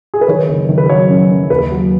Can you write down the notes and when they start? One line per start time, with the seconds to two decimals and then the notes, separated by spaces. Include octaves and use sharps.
0.14 G#4
0.21 B4
0.28 D#3 C#5
0.48 F#1
0.69 D#3
0.78 B4
0.89 F#3 C#5
1.10 F#2
1.30 F#2
1.50 D#2 B4
1.71 F#3